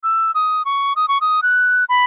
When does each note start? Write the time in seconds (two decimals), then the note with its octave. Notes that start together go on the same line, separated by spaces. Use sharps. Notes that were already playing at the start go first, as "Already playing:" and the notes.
0.03 E6
0.35 D#6
0.65 C#6
0.96 D#6
1.08 C#6
1.21 D#6
1.42 F#6
1.89 B5